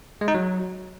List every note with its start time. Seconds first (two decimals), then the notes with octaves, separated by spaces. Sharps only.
0.21 G#3
0.28 D#4
0.34 F#3